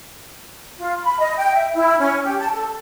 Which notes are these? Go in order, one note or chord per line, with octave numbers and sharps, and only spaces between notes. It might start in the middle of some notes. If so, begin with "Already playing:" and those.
F4
B5
D#5
G5
E5
E4
C#4
G4
A5
A4